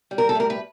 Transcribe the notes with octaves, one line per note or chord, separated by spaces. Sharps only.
G3
A#4
A4
A2 A#4
B4